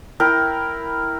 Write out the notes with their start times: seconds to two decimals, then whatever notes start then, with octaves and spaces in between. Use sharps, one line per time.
0.20 E4 A#4 G5